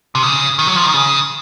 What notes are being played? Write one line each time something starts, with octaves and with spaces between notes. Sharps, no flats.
C3
C#3
D#3
F#3
F3
D#3
C#3